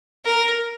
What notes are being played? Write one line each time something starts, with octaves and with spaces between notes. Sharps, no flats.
A#4